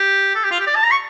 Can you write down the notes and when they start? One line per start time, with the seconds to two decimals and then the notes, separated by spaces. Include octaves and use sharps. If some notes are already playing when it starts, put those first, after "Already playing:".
Already playing: G4
0.35 A4
0.44 G4
0.51 F4
0.60 G4
0.67 D5
0.75 A5
0.83 A#5
0.91 C#6